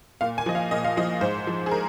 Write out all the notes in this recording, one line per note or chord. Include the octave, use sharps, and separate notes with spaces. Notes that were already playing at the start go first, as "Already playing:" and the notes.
A#2 F5
G#5
F3 D#5
F5
A#2 D#5
F5
F3 D#5
G#2 C5
F3
G#4
A#4